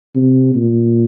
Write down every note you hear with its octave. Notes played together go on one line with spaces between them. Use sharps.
C3
A#2